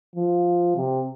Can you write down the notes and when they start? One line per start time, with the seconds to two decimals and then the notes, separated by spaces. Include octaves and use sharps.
0.16 F3
0.77 C3